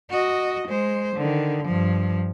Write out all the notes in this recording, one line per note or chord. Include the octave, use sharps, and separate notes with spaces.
F#4 D#5
G#3 C5
D3 D#3
G2 F3